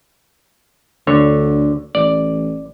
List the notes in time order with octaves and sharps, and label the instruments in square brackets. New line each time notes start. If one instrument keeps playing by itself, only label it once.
[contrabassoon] D2 [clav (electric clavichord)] D3 C#5
[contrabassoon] A1 [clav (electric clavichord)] D5